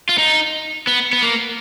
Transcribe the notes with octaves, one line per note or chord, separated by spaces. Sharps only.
F4
D#4
B3
B3
A#3